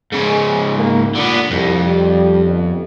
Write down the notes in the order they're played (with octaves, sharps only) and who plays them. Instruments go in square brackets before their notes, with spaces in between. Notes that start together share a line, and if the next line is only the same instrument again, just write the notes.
[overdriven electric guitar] G#2 C#3 [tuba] G#3
[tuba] A#3
[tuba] A#2 [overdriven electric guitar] D3 B3
[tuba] C2 [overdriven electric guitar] F2
[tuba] G3
G1